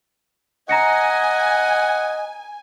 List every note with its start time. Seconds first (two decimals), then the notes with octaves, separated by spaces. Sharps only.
0.69 D#5 F#5 G#5 A#5 A#6 C#7